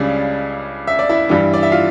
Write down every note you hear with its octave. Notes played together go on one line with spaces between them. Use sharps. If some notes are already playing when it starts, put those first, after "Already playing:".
Already playing: C#2 C#3 G3 D4 D5
E5
D5
E4 E5
G2 E3 G3
D5
E5
F4 F5